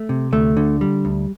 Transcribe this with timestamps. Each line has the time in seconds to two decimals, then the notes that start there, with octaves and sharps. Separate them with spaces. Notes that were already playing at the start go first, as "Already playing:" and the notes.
Already playing: A3
0.09 C3
0.32 D2 A3
0.57 D3
0.81 G3
1.05 D2